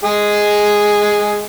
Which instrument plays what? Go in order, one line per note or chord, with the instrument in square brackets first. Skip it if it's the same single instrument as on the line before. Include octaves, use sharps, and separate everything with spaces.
[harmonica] G#3 G#4